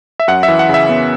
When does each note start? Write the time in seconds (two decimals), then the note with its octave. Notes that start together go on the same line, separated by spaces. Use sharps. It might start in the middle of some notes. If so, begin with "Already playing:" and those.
0.20 E5
0.28 F#2 F#5
0.43 E5
0.48 E3
0.59 F#5
0.69 C#3 E5
0.89 B3